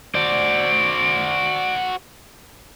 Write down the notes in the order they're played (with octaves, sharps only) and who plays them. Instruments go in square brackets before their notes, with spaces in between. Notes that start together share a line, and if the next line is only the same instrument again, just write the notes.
[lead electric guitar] F#4 C5 [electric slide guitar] D5